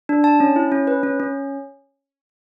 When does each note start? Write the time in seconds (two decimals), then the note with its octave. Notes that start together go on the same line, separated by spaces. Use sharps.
0.09 D4
0.24 A5
0.40 C#4
0.56 E4
0.72 C#4
0.87 B4
1.03 C#4
1.20 C#4